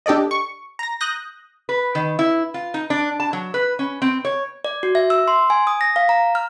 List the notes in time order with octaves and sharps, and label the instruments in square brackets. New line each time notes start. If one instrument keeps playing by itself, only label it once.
[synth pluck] D4 G4 A4 D5 D#5
C#6
A#5 A#6
D#6 F#6 G6 A#6
[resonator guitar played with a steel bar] B4
D#3
E4
F4
D#4
D4
A5
F#3
B4
C#4
C4
C#5
[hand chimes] D5
F#4
E5
E6
C6
G#5
D#6
A#6
F5
A#5
F6